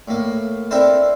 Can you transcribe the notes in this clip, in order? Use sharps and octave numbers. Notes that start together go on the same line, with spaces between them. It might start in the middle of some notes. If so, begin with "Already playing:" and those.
A2 A#3
C4 D4 E4 A4 A#4 C5